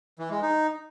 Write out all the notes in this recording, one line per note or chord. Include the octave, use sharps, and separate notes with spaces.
E3
G#3
D#4